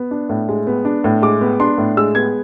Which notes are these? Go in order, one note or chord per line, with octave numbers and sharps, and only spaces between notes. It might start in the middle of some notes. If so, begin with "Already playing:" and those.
Already playing: B3
D4
A2
G#3
B3
D4
A2
G#3 D6
B3
D4 C6
A2
G#3 E6
B3 G#6